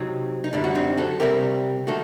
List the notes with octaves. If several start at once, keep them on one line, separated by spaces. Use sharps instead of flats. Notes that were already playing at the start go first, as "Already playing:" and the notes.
Already playing: C3 F#3 C4 D#4
D#4
F#2 D3 G3 D4
F#4
C4 D#4
F#4 A4
C3 G3 C4 G4 A#4
D#3 A3 F#4 A4